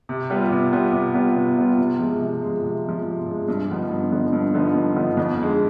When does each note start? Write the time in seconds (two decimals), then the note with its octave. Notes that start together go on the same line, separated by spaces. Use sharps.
0.09 C3
0.30 G3 B3 F4
0.51 C3
0.72 G3 B3 F4
0.93 C3
1.14 G3 B3 F4
1.36 C3
1.57 G3 B3 F4
1.78 C3
2.00 F3 G#3
2.20 C3
2.42 F3 G#3
2.63 C3
2.85 F3 G#3
3.05 C3
3.27 F3 G#3
3.48 G2
3.69 D3 F3 B3 D#4
3.90 G2
4.12 D3 F3 B3 D#4
4.33 G2
4.54 D3 F3 B3 D#4
4.75 G2
4.96 D3 F3 B3 D#4
5.17 F2
5.39 D3 G#3